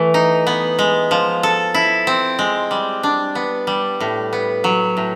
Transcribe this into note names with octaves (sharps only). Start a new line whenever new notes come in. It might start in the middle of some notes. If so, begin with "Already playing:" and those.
Already playing: E3 A3
D#4
B3
G#3
F3
A4
E4
C4
G#3
G3
D4
B3
G3
A2
B3
F#3
A2